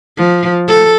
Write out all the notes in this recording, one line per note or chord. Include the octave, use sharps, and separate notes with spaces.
F3
A4